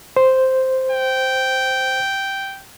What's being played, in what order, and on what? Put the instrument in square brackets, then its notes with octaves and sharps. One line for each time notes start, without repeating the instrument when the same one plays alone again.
[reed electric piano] C5
[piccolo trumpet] G5